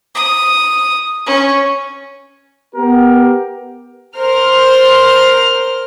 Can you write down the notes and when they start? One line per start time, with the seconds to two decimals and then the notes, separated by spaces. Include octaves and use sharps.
0.15 D#6
1.26 C#4
2.75 B3 G4 A#4
4.17 A#4 C5 F6